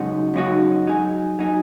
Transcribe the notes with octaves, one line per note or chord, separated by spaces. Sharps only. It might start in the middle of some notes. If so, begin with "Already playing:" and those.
Already playing: F#2 C#3 G#3 D#4 F#4
F#2 C#3 G#3 D#4 F#4
F#3 D#4 G#4
F#3 D#4 G#4